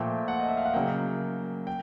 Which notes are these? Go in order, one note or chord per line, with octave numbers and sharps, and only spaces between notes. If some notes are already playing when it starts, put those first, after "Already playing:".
Already playing: A#2 F3 A3 G5
F#5
D#5
E5
F5
F#5
C#3 F#3 A#3 G5
G5